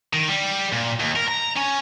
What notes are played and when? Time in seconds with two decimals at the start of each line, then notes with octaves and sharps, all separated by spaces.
0.13 D#3
0.29 G3
0.73 A#2
1.00 D#2
1.16 A#4
1.29 A#5
1.57 C#4